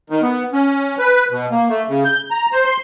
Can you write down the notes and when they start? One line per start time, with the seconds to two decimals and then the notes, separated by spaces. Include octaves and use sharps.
0.10 D#3
0.22 B3
0.53 C#4
0.99 B4
1.31 B2
1.51 A#3
1.70 A3
1.89 C#3
2.05 G6
2.31 A#5
2.53 C5
2.65 C6